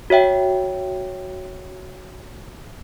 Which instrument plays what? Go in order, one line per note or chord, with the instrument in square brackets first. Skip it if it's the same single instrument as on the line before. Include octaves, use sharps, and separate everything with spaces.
[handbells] F#4 C#5 E5 G5